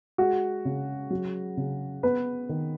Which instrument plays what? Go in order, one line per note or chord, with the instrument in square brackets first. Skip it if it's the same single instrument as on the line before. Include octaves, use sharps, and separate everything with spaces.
[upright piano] G#3 F#4
C#3
F#3
C#3
B3 B4
D#3